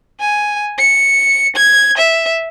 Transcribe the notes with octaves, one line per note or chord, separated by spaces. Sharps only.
G#5
C#7
G#6
E5